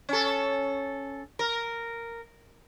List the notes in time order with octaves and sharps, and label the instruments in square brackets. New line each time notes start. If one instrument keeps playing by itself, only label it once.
[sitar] C#4 A4
A#4